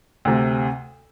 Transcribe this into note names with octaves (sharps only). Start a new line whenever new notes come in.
D2 C3